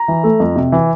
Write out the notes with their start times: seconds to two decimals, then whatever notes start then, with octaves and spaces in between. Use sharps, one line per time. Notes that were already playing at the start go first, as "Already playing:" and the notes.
Already playing: A#5
0.08 E3
0.24 A3
0.40 F2
0.56 C3
0.72 E3